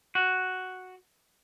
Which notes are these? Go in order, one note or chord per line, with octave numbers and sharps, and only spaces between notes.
F#4